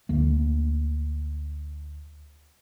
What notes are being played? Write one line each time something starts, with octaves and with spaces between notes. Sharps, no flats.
D2 D3 A#3